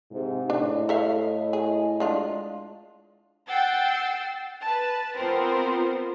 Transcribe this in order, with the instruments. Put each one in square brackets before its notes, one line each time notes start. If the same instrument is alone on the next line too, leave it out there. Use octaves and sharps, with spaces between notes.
[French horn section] G#2 C3
[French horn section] A2 E4 D#5 [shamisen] D4
[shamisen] A4 E5 F5
G#4
G#3 D4 F4
[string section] F#5 G5 E6 A6 C7
B4 A5
B3 C4 F4 A#4 C5